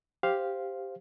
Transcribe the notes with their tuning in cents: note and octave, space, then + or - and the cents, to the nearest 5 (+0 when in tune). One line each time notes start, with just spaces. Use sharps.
G4 +0 C5 +0 F5 +0